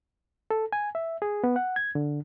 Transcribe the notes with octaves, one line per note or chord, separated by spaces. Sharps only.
A4
G#5
E5
G#4
B3
F#5
G#6
D3